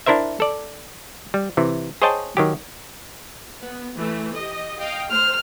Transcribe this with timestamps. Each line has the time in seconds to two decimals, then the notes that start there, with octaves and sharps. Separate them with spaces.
0.06 D4 E4 A#4 C5 E5
0.40 A4 D5
1.34 G3
1.57 C3 E3
2.02 G#4 C5 C#5 D#5 G5 A5
2.37 D#3 F#3 G4
3.60 B3
3.96 E3 A3
4.34 G4 D#5
4.78 D#5 F5 G5
5.11 A3 C5 F6